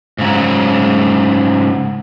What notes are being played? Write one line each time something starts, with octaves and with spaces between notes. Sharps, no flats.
G#2 C#3 F#3